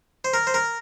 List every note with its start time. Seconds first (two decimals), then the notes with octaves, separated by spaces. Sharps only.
0.24 C5
0.34 A#4
0.47 C5
0.54 A#4